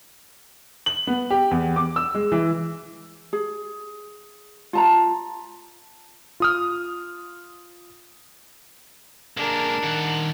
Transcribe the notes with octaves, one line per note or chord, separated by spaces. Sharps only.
F#7
B3
G4
E2
D6
E6
G#3
E3
G#4
F4 A5 A#5
F4 D#6 F6
G#3 A#3 D4 A#4
D#3 F#5